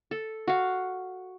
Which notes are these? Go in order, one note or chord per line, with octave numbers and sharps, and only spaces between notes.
A4
F#4 F5